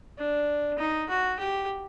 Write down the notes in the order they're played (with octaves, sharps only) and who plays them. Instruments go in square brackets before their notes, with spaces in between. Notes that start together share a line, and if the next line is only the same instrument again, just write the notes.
[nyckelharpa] D4
D#4
F#4
G4